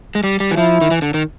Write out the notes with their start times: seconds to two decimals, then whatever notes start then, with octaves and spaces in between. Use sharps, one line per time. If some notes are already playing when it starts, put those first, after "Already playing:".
0.15 G#3
0.24 G3
0.40 G3
0.51 E3
0.57 F3 E4
0.81 D#3
0.91 E3
1.02 D3
1.14 D#3